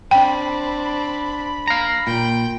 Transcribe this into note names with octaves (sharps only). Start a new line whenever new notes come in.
C4 D4 G5 B5
F5 A#5
A#2 G5